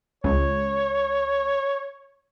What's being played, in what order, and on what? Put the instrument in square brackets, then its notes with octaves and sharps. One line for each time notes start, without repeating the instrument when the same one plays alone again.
[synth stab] C#2 [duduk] C#5